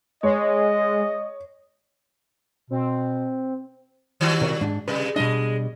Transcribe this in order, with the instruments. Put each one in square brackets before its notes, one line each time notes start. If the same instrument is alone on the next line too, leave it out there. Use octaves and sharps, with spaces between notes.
[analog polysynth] G#3 [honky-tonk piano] C#5 [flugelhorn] D#5
[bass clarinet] B2 [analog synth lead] C4
[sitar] D#3 G3 F#4
[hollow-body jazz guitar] C3 A#4 C#5
G#2 D4
[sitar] C3 G3 G#3 [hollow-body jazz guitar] B4
[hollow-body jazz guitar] B2 G3 D4 [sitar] G#3 D#5